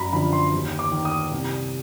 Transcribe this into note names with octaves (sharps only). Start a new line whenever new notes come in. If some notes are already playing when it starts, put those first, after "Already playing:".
Already playing: F#2 A#5 B5
D3 F3 B5
C6
D#2
D6
D#3
D#6
C2